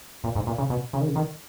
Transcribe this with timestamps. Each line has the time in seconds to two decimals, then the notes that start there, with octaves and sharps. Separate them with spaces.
0.24 A#2
0.35 G#2
0.47 A#2
0.58 C#3
0.70 B2
0.93 C#3
1.01 D#3
1.08 C#3
1.16 D#3